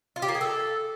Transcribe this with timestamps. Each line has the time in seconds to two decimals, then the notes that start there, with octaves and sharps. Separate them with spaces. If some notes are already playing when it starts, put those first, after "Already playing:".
0.16 F4
0.22 G4
0.28 A#3
0.35 G#4
0.41 A4